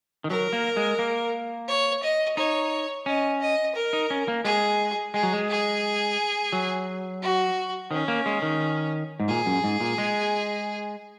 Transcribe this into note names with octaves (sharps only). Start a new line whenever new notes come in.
D#3
F#3 A#4
A#3
G#3
A#3
C#5
D#5
D#4 C#5
C#4 D#5
D#5
A#4
D#4
C#4
A#3
G#3 G#4
G#3 G#4
F#3
G#3
G#4
F#3
F#4
D#3 C#4
A#3
G#3
D#3
G#2
A#2 G#4
F#2
G#2
A#2
G#3